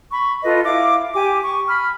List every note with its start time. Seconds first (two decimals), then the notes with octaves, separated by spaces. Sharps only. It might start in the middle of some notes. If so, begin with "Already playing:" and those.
0.11 B5 C#6
0.43 F4 A4 B4 D#5
0.64 E4 F5 D6
1.15 G4 G#5 D6
1.43 C#6
1.68 B5 F6